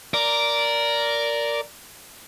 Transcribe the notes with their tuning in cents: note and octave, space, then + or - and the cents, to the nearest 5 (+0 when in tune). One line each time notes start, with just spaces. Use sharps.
A#4 +0 D5 -10